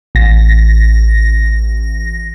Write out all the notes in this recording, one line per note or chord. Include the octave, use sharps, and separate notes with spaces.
A1 A#6